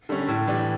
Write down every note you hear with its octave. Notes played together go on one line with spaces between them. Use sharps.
D3 G3 C#4
A2
E3 G3 D4